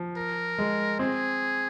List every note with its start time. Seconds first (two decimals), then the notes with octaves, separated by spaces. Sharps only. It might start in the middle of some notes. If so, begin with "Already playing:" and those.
Already playing: F3
0.17 A#4
0.58 G#3
0.99 C4 G#4